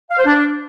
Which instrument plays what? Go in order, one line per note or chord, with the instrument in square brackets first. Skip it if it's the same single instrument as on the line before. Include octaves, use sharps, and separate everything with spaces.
[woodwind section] F5
C5
D4